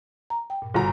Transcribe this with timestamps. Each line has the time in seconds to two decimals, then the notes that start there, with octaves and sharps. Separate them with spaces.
0.30 A#5
0.50 G5
0.62 G2 A#2
0.74 G1 B2 F#4 A#5